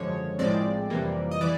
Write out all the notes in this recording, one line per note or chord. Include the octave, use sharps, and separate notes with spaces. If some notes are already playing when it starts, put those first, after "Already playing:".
Already playing: G#1 F#2 D3 F3 G#3 C#5
A#1 A2 F3 G#3 C4 D5
F2 C3 E3 G3 A#3
D#5
E3 D5